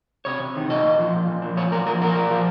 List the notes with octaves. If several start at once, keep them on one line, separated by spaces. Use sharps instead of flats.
C3 C#5
C3
D#3
A#2 D#5
A#2
F3
A#2
A#2
F3
A#2 C#5
A#2 A#4
F3 A#4
A#2 A#4
A#2
F3